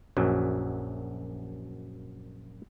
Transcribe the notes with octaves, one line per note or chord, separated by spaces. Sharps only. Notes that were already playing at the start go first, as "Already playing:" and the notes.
A#1 F#2 F#3